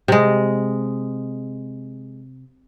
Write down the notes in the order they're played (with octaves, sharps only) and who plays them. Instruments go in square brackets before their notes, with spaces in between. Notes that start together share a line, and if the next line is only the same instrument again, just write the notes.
[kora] C3 G#3